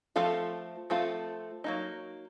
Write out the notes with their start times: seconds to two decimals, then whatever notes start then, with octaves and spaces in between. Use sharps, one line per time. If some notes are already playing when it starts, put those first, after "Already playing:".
0.16 F3 A3 C4 F4 A4
0.90 F3 A3 C4 F4 A4
1.64 F#3 A#3 D#4